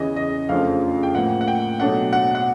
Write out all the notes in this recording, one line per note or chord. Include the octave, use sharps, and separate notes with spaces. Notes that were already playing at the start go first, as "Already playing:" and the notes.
Already playing: E2 C#3 E3 D#5
D#5
F2 C#3 F3 A3 D4 F5
G5
A2 F3 A#3 F#5
F#5
G5
B2 F#3 A3 D4 F#5
F#5
F#5